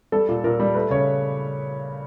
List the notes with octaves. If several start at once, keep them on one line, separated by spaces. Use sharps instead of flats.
G3 A4
A#2
A#2 A#4
G3
A3 B4
C#3 C#5